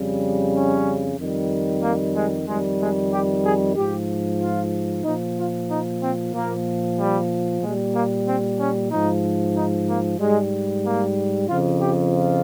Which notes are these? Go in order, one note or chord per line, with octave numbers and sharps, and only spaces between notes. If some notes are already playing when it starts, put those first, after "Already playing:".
Already playing: F2 C#3 G3
C#4
F2 D#3 G3
A#3
G#3
F2 D#3 G3 G#3
G#3
G4
G#4
G#2 F3 G4
F4
A#2 F3 D#4
F4
D#4
C4
A#2 F3 A#3
G3
A#2 G3 G#3
A#3
C4
C#4
G#2 F3 D#4
D#4
A#3
G#2 G3 G#3
A#3
F2 C#3 F3 F4
G4
F4